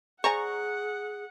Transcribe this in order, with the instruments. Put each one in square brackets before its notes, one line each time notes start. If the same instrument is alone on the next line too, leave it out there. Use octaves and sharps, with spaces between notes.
[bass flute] G#4 [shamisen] C5 D5 G#5 [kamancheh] F#5 [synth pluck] A#5 C#6